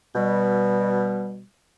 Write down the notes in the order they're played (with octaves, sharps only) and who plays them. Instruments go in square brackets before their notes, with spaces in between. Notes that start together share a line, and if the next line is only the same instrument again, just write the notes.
[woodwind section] B2 G3